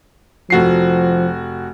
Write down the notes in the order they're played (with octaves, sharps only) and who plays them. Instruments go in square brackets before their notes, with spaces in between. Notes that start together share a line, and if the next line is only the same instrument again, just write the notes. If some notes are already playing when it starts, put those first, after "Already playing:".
[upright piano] F1 F#4 C7 [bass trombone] F3